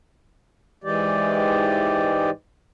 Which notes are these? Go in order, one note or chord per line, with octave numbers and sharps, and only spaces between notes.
G#2 E3 G#3 G4 D5